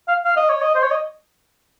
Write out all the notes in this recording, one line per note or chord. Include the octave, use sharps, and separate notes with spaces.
F5
F5
D#5
C#5
D#5
C5
C#5
D#5